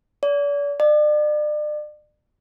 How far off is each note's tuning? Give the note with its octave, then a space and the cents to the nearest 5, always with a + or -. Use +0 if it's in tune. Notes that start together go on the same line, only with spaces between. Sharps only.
D5 -40
D5 +35